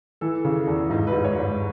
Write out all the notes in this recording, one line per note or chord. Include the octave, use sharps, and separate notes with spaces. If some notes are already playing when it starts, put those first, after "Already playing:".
E3 A4
C#3
E2
G#2 D#4
B4
G#2
C#5
G#2